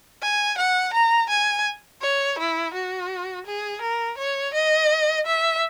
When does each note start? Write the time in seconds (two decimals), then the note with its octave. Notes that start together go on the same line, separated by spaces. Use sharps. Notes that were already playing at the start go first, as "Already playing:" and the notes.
0.22 G#5
0.58 F#5
0.93 A#5
1.30 G#5
2.02 C#5
2.39 E4
2.74 F#4
3.46 G#4
3.82 A#4
4.18 C#5
4.54 D#5
5.26 E5